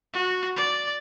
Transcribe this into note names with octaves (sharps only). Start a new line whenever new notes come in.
F#4
D5